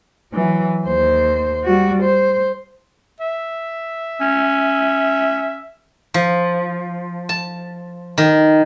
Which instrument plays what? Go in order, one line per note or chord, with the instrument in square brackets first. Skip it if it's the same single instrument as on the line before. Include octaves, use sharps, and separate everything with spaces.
[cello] E3 F#3
D#2 C5
G3 F#4
C5
[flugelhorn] E5
[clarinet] C#4
[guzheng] F3
A5
D#3